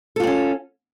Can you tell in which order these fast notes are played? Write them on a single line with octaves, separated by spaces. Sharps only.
A4 F4 C4 C#4